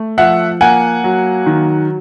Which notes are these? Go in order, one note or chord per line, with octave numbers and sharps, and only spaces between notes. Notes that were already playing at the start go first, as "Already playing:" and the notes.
Already playing: A3
F3 E5 F#5
A#3 F#5 G#5
F#3
D#3